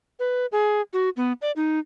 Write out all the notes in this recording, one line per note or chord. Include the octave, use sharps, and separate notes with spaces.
B4
G#4
F#4
B3
D5
D#4